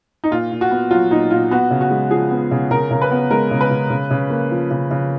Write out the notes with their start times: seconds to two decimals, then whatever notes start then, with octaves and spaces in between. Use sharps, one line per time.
0.24 D#4
0.31 A#2 F4
0.51 A#2
0.61 F#4
0.71 B3
0.91 F#3 F4
1.11 A#2 D#4
1.30 A#2 F4
1.51 B3 F#4
1.71 C#3
1.81 F#4
1.91 G#3
2.11 F3 G#4
2.31 B3
2.51 C#3
2.71 C#3 A#4
2.91 C#3 A#4
3.01 B4
3.11 B3
3.31 G#3 A#4
3.51 C#3
3.61 B4
3.71 C#3
3.90 C#3
4.11 C#3
4.30 A#3
4.51 F3
4.71 C#3
4.91 C#3